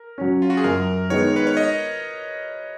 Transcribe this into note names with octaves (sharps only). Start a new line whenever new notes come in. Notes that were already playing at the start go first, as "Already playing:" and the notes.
Already playing: A#4
F#3 C#4
F4
F#4
G#4
F#2 A#4
D#3 G#3 B3 C#5
B4
C#5
D#5